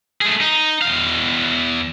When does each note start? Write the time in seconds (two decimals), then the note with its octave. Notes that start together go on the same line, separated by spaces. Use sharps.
0.21 A3 G#4
0.41 D#4
0.82 E2 F5